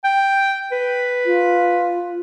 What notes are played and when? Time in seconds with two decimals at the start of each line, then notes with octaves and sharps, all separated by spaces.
0.04 G5
0.72 B4
1.25 F4